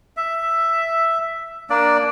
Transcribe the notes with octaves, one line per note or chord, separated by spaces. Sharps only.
E5
A#3 D4 D5